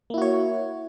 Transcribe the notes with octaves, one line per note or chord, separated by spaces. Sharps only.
A#3 E4 F#4 C#5